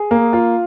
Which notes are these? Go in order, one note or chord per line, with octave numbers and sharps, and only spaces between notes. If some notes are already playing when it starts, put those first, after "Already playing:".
Already playing: G#4
A#3
F4